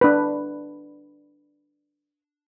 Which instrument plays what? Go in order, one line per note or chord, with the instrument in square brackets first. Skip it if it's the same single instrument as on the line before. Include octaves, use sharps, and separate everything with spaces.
[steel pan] D4 B4